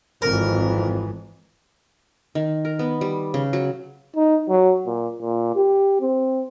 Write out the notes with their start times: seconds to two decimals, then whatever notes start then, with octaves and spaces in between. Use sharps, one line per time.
0.22 G#1 F2 E3 A#4
2.35 D#3
2.65 A#4
2.79 B3
3.01 G3
3.34 C#3
3.53 F#3
4.16 D#4
4.49 F#3
4.86 A#2
5.22 A#2
5.56 G4
6.01 C4